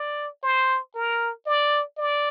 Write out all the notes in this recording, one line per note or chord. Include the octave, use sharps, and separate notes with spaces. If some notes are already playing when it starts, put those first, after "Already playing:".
Already playing: D5
C5
A#4
D5
D5